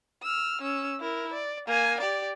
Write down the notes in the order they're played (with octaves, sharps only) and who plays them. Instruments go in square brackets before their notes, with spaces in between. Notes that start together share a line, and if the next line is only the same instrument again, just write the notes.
[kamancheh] E6 F6
C#4 E6
E4 A#4
D5
A#3 G#5
G4 D5